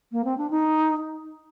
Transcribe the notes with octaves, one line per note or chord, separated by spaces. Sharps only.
A#3
C4
D4
D#4